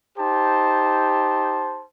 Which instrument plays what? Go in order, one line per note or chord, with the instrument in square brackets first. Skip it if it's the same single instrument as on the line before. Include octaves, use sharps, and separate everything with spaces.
[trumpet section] D#4 G4 C5 A5